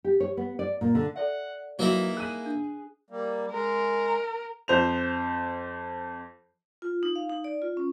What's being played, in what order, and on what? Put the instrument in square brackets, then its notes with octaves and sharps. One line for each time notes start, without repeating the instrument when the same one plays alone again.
[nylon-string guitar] G4
C#5
B3
D5
A#2
D3
[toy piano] A4 D5 E5 [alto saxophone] F#5
[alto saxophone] E3 [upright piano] F#3 [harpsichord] A#3 D#4 E4
[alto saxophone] G#4 [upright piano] F#6 D#7
[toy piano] D4
[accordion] G3 A#3
[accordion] G#3 [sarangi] A#4
[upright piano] F2 C5 F7
[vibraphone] F4
D#4
F5
D#4
D5
F4
C#4